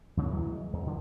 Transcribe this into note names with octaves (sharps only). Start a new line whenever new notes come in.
D#2 C#3 G#3
E3 F#3 G#3
G#3
E2
D3 D#3